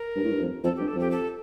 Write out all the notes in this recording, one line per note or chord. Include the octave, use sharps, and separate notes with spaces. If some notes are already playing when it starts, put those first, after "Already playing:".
Already playing: A#4
G2
A2
G2
F2
F2 A4
G4
G2
A4
F2 G4
A4